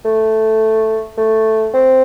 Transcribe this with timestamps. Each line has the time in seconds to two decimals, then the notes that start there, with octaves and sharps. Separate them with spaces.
0.05 A3
1.18 A3
1.74 C4